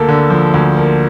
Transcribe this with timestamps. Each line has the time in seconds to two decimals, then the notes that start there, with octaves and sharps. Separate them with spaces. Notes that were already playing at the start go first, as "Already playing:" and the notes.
Already playing: D2 A#3 A4
0.08 D3
0.30 F3
0.54 D2
0.77 A#3